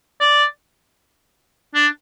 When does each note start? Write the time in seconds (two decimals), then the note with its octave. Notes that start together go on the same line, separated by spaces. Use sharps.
0.21 D5
1.75 D4